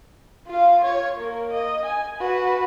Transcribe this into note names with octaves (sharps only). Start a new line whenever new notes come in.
F4 F5
C#5
A#3 A#4
D#5
G#5
F#4 B4